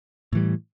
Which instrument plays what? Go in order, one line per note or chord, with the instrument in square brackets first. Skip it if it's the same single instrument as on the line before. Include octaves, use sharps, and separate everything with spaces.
[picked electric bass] A2 E3 G3